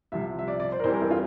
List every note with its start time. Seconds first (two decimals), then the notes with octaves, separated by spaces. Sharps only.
0.12 C2 C3 F3 E5
0.39 E5
0.48 D5
0.60 D5
0.72 C5
0.79 A#4
0.84 E2 E3 G3 C4 C5
0.93 A#4
1.02 A4
1.10 F4